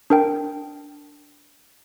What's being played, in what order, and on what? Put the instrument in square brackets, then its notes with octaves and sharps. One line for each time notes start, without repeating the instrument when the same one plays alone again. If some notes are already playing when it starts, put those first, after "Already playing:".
[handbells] D4 A#4 G5